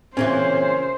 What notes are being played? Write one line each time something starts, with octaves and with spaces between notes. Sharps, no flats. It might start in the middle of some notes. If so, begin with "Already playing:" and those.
A#2 C#3 E3 C4 C#4 C5